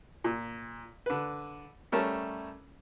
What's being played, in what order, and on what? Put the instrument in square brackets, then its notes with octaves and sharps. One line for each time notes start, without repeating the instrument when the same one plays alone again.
[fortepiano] A#2
D3 B4
G3 A3 C#4 A#4 A5